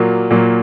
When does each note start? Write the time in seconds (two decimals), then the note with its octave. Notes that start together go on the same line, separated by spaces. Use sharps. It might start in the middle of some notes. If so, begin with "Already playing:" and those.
Already playing: A#2 F#3 A#3
0.31 A#2 F#3 A#3